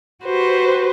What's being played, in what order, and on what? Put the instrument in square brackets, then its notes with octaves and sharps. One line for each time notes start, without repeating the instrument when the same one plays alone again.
[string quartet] F#4 G4 B4 C5